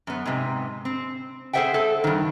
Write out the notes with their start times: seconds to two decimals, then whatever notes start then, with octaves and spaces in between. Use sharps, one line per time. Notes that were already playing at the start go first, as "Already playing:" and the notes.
0.07 F#2 B3
0.26 G#2 C3
0.85 C4
1.53 G#4 A4 C5 E5 F#5 G5
1.74 A4 C5
2.04 G2 D#3